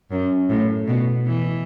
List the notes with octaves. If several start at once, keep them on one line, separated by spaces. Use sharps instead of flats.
F#2
A2
B2
E3